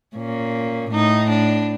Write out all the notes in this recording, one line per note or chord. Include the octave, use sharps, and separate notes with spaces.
A#2 C#4
A2 D#4
D4